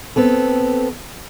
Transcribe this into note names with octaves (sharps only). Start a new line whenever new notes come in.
B3 C4 A4